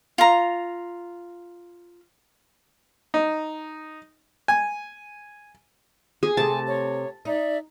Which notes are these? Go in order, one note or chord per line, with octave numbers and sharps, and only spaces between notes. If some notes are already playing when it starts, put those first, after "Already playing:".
F4 A#5
D#4
G#5
G#4
C3 A3 G#5 A5
C#5
D#4 D5 E5